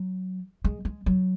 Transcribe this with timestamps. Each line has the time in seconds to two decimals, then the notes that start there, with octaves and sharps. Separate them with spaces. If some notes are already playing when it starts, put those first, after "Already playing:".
Already playing: F#3
0.64 G#3
0.85 G#3
1.06 F#3